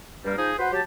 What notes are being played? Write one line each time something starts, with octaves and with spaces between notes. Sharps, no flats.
G2 G3 A#3
F3 D#4 G#4
F#4 B4 C5
F#3 G4 A5